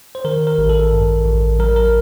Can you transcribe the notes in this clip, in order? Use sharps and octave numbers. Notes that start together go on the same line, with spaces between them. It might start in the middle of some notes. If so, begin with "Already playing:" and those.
C5
D#3 A#4
A#4
A1
A4
G2
A1
F#3 A#4
A#4